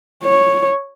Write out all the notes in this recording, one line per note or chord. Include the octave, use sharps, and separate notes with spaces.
C#5